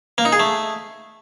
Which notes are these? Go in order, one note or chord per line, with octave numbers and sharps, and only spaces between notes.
A#3
D#4
G#4
A3